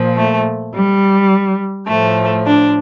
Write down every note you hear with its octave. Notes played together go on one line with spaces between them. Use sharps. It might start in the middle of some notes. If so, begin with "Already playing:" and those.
Already playing: A#2 F3
A3
G3
A2 F3 A3
D4